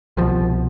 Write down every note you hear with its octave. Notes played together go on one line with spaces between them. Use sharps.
C2 B2 F3